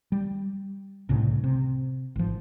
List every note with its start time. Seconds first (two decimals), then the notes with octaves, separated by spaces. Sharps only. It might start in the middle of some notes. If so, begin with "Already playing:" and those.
0.12 G3
1.09 C2 A2 C#3
1.44 C3
2.16 G#1 F3